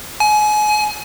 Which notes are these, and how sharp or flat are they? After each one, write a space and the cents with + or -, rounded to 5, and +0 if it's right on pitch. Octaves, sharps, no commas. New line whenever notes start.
G#5 +30